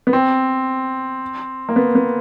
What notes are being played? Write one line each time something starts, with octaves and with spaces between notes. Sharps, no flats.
B3
C4
A#3
B3
B3